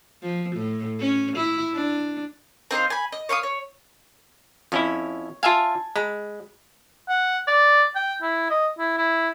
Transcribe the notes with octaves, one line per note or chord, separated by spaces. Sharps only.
F3
A2
C#4
E4
D4
C4 D#4 C5 F5
G#5 B5
D#5
C#5 F5 C6 D#6
C#5
F2 C#4 E4 C#5
F4 E5 F5 G#5 A5
G#3 B5
F#5
D5
G5
E4
D#5
E4
E4